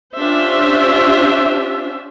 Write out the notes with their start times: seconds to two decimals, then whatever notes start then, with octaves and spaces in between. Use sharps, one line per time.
0.17 C#4 D4 F4 G4 C5 E5